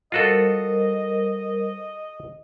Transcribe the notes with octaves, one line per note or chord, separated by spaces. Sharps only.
G3 F4 F#4 A4 A#4 C5 D#5